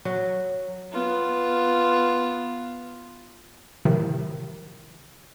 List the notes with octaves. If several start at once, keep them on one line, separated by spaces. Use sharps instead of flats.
F#3
B3 F4
A2 C3 D#3 F3